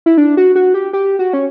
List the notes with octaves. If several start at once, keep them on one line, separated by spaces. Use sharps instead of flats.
E4
D4
F#4
F#4
G4
G4
F#4
C#4